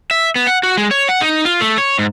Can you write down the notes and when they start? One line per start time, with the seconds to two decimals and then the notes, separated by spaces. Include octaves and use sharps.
0.11 E5
0.36 B3
0.47 F#5
0.63 F#4
0.77 G#3
0.91 C#5
1.09 F#5
1.21 D#4
1.45 F4
1.61 A3
1.78 C#5
1.99 G#2